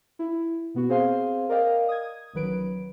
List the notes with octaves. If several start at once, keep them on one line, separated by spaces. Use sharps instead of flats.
E4
B2 B3 F#4
C4 G#4 C5 F5 G#5 C6
A#4 D5 D#5 F5 G5
D#6 G#6
A1 D#3 F#3 B4 D7